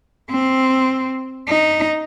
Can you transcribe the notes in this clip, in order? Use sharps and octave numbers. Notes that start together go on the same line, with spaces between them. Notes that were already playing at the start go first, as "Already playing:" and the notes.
C4
D#4